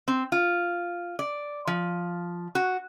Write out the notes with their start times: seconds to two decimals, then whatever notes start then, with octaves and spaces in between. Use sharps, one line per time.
0.08 C4
0.32 F4
1.19 D5
1.67 F3
2.55 F#4